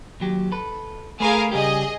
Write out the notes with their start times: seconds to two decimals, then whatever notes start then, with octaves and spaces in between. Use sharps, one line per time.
0.20 D#2 F#3 G4
0.52 A4 B4
1.20 A3 G#4 A#4 B4 F5
1.52 C#3 G3 G4 G#4 D#5